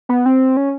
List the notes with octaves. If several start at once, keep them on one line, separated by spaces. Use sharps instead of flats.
B3
C4
C#4